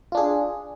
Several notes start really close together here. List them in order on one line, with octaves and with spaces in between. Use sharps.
F4 D4 G#4